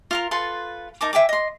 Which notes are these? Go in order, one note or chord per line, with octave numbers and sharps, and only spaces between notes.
F4 A#4 C6
F4 A4 B4 C6
D#4 A#4 A5 D6
E5 G5 G#5 D6
D#5 C6